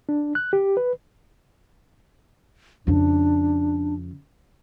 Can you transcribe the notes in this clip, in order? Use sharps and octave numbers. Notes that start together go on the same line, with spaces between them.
D4
F#6
G4
B4
F2 C#3 D4